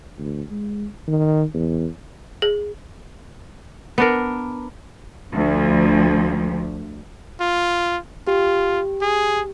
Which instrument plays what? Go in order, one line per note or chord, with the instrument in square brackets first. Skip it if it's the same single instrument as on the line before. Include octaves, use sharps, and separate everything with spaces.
[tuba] D2
G#3
D#3
E2
[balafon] G#4
[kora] B3 D4 A#4
[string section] D2 F3
[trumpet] F4
[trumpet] F4 [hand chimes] G4
[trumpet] G#4